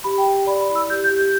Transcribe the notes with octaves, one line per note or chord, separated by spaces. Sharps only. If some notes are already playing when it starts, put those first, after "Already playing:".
G4 B5
G5
G4
D5 B5
B5
E4
E6
G4 G6
G6
G4
G6